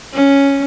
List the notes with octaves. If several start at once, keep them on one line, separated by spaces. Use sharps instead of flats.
C#4